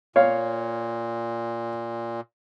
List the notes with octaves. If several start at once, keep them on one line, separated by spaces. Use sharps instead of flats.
A#2 C#5 F5